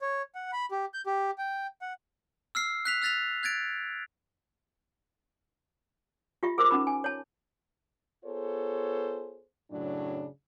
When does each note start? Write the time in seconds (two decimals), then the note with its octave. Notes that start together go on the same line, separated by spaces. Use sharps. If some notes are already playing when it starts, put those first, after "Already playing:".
0.01 C#5
0.35 F#5
0.53 B5
0.71 G4
0.94 G6
1.06 G4
1.38 G5
1.82 F#5
2.55 E6 F6 C7
2.85 F#6 B6 F7
3.02 E6 F#6 A6 B6 F7
3.43 F#6 G#6 A6 D7
6.43 F4 G4 E5
6.58 G#4 A#4 C5 D6
6.71 C#4 D#4 B5
6.87 G#5
7.04 C#5 A5
8.24 B3 F4 G#4 A4 C5 C#5
9.71 F#2 A2 C#3 F#3 D4